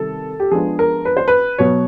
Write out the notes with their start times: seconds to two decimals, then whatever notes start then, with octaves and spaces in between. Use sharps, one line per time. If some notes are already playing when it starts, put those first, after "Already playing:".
Already playing: C3 D#3 G3 A4
0.40 G4
0.51 F3 G#3 B3 D4 G#4
0.79 A#4
1.05 B4
1.17 C5
1.28 B4
1.59 B2 F#3 B3 C#5